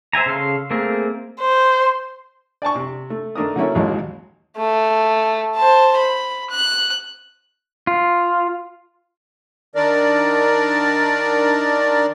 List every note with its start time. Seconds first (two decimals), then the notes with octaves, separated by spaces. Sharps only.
0.13 C5 E5 G#5 A#5
0.26 C#3 A4 F5 C6
0.71 A3 A#3 C4 G#4 A#4
1.41 C5
2.62 D5 G#5 A5 C#6
2.76 C3
3.10 A3
3.36 D#3 A3 D4 A#4 D#6
3.56 D3 F#3 A3 A#3 C#4 E4
3.75 A1 D#2 D#3 E3 F#3 G#3
4.57 A3
5.56 C5 A5
5.98 B5
6.50 F#6
7.87 F4
9.75 D#3 D4 A#4 D5